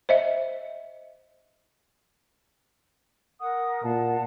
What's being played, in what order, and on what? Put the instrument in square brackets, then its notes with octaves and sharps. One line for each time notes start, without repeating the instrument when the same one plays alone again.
[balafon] C5 D#5 E5
[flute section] A#4 F#5 D#6
[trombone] A#2 [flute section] F5 F#5 A5